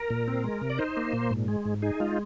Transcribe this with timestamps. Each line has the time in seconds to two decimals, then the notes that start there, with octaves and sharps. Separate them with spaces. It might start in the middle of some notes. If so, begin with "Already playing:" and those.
Already playing: A#4
0.10 A#2
0.28 C4
0.44 G#3
0.61 C3
0.70 D5
0.78 D#4 C5
0.97 A#3
1.13 A#2
1.30 G#2
1.48 G#3
1.65 G#2
1.82 D#4 G#4
2.00 G#3 F4